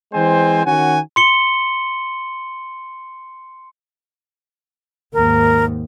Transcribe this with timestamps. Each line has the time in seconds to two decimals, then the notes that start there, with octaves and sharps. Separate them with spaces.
0.14 E3 G#3 C4 C5 G#5
0.66 D#3 C#4 F#4 F#5 G#5
1.16 C6 C#7 G7
5.14 D#2 G#2 A#4